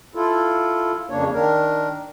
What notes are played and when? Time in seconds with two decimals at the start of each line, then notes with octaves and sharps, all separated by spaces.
0.15 E4 F4 A4
1.10 F2 C#3 A#3 D4 C#5
1.34 D#3 D4 A#4